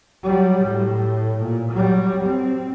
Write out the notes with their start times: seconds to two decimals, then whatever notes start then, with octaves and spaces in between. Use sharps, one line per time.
0.23 F#3 G3
0.64 A2
1.41 A#2
1.72 F#3 G3
2.25 C4